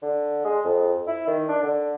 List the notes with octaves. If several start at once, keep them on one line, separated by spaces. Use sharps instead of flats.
D3
G#3
F2
E4
D#3
D4
D3